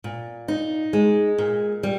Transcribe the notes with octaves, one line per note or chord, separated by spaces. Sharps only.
A#2
D#4
G#3
A#2
G3